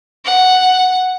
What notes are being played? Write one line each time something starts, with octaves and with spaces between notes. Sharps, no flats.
F#5